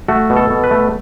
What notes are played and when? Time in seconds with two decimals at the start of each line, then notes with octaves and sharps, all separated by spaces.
0.08 A3 F#4
0.30 B2
0.37 A4
0.50 B2
0.64 B4
0.71 A3